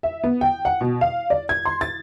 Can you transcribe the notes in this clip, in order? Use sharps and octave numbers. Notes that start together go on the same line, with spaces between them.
E5
B3
G5
F#5
B2
F5
D5
G#6
C6
A6